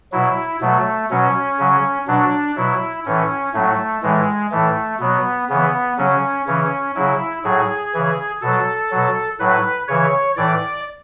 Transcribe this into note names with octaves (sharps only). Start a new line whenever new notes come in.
B2 F#3 E4
B2 F#3 A3
B2 F#3 C#4
C#3 F#3
B2 F#3 D4
B2 F#3 E4
A2 E3 C#4
A2 F#3 A3
A2 E3 G#3
A2 E3 A3
B2 F#3 B3
C#3 E3 B3
C#3 F#3 C#4
C#3 E3 C#4
C#3 F#3 E4
A2 F#3 G#4
C#3 E3
B2 F#3 A4
B2 F#3
A2 F#3 B4
C#3 E3 C#5
A2 E3 D5